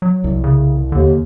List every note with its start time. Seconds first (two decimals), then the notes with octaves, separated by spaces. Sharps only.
0.02 F#3
0.24 C2
0.44 C#3
0.92 D#2 D3